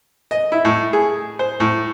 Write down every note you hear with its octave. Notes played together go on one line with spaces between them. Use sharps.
D#5
E4
A2
G#4
C5
A2